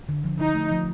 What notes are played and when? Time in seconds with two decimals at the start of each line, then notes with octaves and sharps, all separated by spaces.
0.09 D3
0.24 F3
0.40 D3 D#4
0.55 A3
0.71 F3